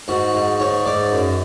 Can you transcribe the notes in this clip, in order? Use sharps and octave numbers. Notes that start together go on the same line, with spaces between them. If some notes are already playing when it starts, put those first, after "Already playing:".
G#2 F#4
G#2
G#2 C#5
G#2 D5
F#2